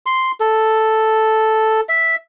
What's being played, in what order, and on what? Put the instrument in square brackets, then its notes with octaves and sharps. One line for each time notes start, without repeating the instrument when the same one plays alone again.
[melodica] C6
A4
E5